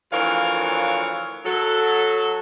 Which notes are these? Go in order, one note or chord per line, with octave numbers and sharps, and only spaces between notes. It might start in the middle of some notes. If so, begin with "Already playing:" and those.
D2 E3 F3 A#4 C#5 F5
F#3 A4